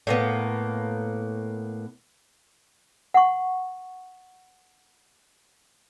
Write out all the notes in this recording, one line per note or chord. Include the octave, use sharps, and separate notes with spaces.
A2 A#3 B3
F#5 C#6